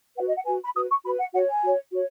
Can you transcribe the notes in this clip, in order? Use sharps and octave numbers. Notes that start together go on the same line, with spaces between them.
F#4 B4 F#5
D#5
F#5
F#4 B4 G#5
B5
F#4 B4 D#6
C#6
F#4 B4 B5
F#5
F#4 C#5 F#5
G#5
F#4 C#5
F#4 C#5